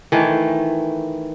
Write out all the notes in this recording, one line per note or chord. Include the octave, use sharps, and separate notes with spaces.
D#3 E3 A3